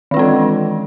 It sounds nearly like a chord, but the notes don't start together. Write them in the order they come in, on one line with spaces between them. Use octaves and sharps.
D#3 D4 G#3 C4 E3